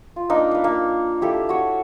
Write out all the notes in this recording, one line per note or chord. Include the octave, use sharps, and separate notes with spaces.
F4
A#3 D4 D#4
B4 F5
A#3
E4 G4 A4 F5
F#4 C#5